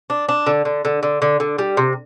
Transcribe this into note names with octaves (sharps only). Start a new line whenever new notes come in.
D4
D4
D3
D3
D3
D3
D3
D3
G3
C3